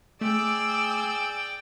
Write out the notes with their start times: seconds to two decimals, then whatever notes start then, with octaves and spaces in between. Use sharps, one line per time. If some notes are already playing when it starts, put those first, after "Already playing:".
0.21 A3 G#4 D5 G5 E6